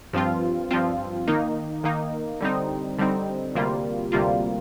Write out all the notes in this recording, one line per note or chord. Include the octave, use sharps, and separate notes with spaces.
G2 F3 C4 F4
G2 F3 C4 F4
D#3 A#3 D#4
D#3 A#3 D#4
D3 G3 C4 D#4
D3 G3 C4 D#4
D2 C3 G3 A#3 F4
D2 C3 G3 A#3 F4